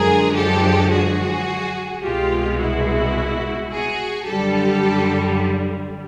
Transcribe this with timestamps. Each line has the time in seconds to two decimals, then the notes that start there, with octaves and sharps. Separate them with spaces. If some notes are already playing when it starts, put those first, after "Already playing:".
Already playing: F#2 D3 F3 G#3 G#4 A#4
0.36 G4 A4
0.92 F#4 G#4
2.03 C2 B2 G#3 F4 G4
2.59 E4 F#4
3.71 F#4 G#4
4.26 F#2 D3 G3 G4 A4